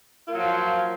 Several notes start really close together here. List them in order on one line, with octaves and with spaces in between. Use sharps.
F4 A#3 F#3 F3